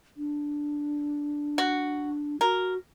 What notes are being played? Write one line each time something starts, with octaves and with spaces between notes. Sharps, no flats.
D4
F#4
F#4 A#4